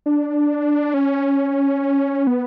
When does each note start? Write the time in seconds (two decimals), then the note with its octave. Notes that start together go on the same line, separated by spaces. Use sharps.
0.06 D4
0.94 C#4
2.27 B3